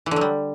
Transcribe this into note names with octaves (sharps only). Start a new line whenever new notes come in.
E3
D3
F#3
G3